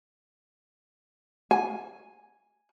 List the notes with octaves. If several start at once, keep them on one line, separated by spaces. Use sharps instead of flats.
G#5